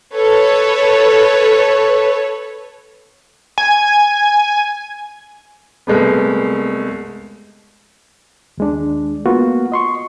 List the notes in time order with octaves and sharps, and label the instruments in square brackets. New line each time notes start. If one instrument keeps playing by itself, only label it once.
[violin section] A4 B4 C#5
[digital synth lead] G#5
[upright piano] C2 G#3 A3 B3
[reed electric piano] D#2 G#3 D4
A#3 B3 F4 F#4
D#5 C6 C#6